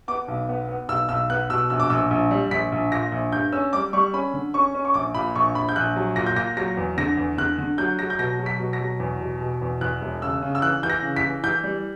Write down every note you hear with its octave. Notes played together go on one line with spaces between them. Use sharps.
B3 D6
B1
B3
B3
B1 E6
B1 E6
B3 F#6
B2 E6
A#1 E6
D6
A#1 E6
A#1
G3
A#1 B6
A#1
A#2 A#6
A#1
G2 G6
C#4 E6
G3 D6
G3 C#6
C#4 B5
D3
C#4 C#6
C#4
C#6
A#1 D6
A#2 B5
A#1 C#6
A#1 B5
G6
A#1 F#6
F#3
A#2 A#6
G6
A#2 A#6
F#3 A#6
E2
D3 A#6
E2
D3 F#6
D3
F#3 G6
F#3 A#6
G6
B2 A#6
F#3
B6
B2
A#6
F#3
E2
B2
B2
E2
E2 F#6
E1
C#3 E6
C#3
E6
E3 F#6
E3 G6
A#6
C#3
B6
E3
E3 G6
G3